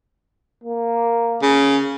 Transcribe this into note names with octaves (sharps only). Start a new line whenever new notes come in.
A#3
C#3